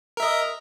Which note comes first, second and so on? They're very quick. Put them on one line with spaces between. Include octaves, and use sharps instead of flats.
A#4 E5 D#5